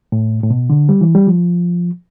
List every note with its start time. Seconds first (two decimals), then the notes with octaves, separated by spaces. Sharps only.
0.12 A2
0.43 A2
0.50 B2
0.70 D3
0.89 G3
1.01 E3
1.15 G3
1.27 F3